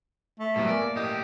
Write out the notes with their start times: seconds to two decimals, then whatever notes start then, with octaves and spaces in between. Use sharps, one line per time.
0.40 A3
0.56 A2 F#3 G3 B3
0.68 A#4 D5 G#5
0.82 A#3
0.96 A2 G4 D#5